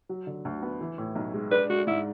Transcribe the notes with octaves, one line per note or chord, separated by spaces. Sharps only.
F#3
D3
D2
B3
E3
A2
B1
G#3
D4 B4
G#3 F#4
G#2 E4